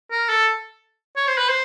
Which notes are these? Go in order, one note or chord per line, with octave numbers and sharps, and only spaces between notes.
A#4
A4
C#5
C5
B4
C5